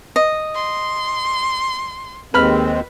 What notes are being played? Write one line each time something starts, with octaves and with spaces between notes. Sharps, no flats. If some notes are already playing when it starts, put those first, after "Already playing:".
D#5
C6
D#2 G#3 C4 B4 B5 F6